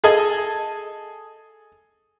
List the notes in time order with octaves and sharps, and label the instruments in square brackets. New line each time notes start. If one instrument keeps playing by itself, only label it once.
[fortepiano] G#4 A4 D#5 G#5